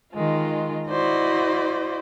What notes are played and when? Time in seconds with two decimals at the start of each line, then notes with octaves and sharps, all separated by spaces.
0.13 D#3 G#3 F4
0.89 E4 F#4 C5 D5 D#5